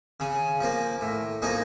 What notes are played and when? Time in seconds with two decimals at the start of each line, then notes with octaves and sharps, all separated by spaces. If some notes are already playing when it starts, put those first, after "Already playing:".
0.20 C#3 G#5
0.61 F3 A#3
1.01 A2
1.42 F3 A#3 D#4 G#4